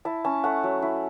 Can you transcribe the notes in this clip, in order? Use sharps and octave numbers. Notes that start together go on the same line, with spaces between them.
E4 A5
C#4 A5
A3 F#5
F#3
E4